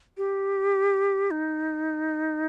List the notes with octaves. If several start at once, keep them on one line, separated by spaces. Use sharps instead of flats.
G4
D#4